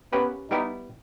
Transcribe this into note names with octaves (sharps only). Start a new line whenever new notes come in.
A#3 B3 C#4 G4 B4
G3 B3 D#4 E4 G4